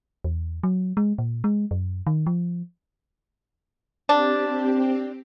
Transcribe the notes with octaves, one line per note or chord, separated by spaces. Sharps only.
E2
F#3
G#3
A#2
G#3
F#2
D#3
F3
C4 D4 G4